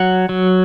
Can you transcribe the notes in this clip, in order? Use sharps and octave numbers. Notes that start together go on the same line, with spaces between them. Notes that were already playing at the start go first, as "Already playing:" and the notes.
Already playing: F#3 F#5
F#3